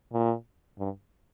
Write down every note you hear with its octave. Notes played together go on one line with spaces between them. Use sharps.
A#2
G2